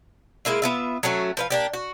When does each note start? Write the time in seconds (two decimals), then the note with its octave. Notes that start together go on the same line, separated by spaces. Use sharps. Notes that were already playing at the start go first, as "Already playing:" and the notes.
0.45 G#3 A#3 E4 F4
0.62 B3 F4 E5
1.03 F#3 A3 C#4 F#4
1.37 F3 B4 F5
1.50 A#3 D4 G4
1.73 F#4